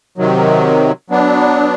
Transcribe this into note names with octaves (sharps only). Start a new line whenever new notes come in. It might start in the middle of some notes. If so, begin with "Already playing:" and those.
C3 D#3 F#3
F#3 B3 D4